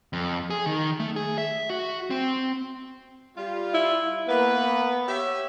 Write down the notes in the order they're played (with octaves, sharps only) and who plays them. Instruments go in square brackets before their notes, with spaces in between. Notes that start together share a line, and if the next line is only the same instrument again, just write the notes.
[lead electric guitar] F2
G#4
D#3
A3
G#4
E5
F#4
C4
[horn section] G3 F4
[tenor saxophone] E4
[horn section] A#3 B4 [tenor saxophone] B3
[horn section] G4 C#5 E5